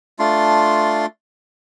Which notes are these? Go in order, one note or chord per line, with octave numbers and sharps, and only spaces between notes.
A3 D4 F4 C6